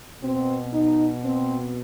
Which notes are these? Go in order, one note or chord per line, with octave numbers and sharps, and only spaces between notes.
B2 C4
D#4
C4